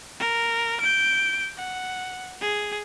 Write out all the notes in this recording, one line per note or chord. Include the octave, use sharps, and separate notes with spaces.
A#4
G6 D7
F#5
G#4